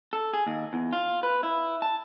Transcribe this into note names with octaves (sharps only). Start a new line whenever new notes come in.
A4
G#4
D#2
E2
F4
B4
E4
A5